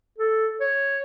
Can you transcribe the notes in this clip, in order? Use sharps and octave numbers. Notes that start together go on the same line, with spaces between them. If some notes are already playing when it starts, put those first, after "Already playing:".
A4
C#5